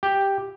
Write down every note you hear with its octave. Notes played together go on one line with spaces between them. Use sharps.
G4